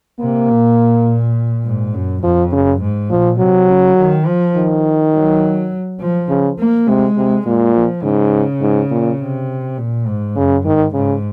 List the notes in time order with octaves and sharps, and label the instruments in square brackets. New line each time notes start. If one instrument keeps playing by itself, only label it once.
[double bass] C3 [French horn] A#3
[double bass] A#2
G#2
F#2
[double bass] F2 [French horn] F3
[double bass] F#2 [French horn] C#3
[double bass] G#2
[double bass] A#2 [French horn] F3
[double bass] C3 [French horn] F#3
[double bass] C#3
D#3
F3
[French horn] D#3
[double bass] F#3
F3
[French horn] C#3
[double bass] A#3
[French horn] C3 [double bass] G#3
[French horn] C3
[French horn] A#2 [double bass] G#3
[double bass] F3
[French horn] G#2 [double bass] C#3
[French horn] G#2
A#2
[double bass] C3
A#2
G#2
[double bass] F#2 [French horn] C#3
[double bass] G#2 [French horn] D#3
[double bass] G#2 [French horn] C#3